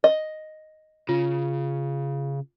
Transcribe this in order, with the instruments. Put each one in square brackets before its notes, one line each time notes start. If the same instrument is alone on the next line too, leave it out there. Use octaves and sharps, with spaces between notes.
[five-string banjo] D#5
[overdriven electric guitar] C#3 [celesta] F4